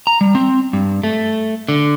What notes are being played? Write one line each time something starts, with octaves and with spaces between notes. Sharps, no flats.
A#5
G3
C4
G2
A3
D3